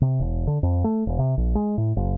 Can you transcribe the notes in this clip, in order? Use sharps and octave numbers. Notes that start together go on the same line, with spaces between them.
C3
E1
D3
F2
A3
E1
C3
A#1
G#3
A2
F#1